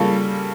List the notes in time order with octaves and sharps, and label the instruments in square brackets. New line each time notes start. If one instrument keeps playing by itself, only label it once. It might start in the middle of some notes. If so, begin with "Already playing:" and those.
Already playing: [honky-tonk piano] C#3 G3 A#3 F4 A4